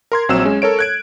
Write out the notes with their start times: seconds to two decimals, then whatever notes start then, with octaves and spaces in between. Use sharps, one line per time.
0.12 A#4 C6 G#6
0.29 A#1 F#3 C4 E6 E7
0.45 G#3 C#4
0.62 A4 A#4 C#5 D7
0.79 F#6 G#6 D7